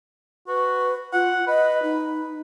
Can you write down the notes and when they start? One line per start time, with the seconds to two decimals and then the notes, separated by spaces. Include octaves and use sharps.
0.48 F#4 B4
1.13 F4 F#5
1.47 B4 D#5
1.83 D#4